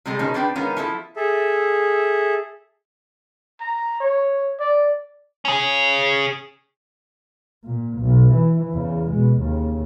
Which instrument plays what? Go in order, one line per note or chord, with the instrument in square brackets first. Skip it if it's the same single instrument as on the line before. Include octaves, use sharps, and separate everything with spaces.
[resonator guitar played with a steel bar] C3 G3 G#3 G#4 A4
B2 D#3 F3 C#4 D#4 G#4
C4 D4 G#4 B4 G5
D#3 G#3 B3 C#4 F4 A#4
F3 E4 A4 A5
[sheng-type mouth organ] G#4 A4 E5
[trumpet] A#5
C#5
D5
[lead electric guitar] C#4 G#4
[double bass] A#2
B1
E3
E2 C#3
B2 G#3
D#2 C#3